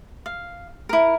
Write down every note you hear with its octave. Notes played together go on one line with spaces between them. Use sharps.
F5
E4 A#4